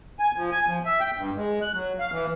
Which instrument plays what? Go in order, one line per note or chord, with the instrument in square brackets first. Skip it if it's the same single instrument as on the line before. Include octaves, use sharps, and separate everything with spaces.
[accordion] G#5
F3
G#5
F3
E5
G5
G2
G#3
F#6
F#3
F5
E3